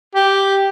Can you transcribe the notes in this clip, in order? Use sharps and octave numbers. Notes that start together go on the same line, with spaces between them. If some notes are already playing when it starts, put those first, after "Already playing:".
G4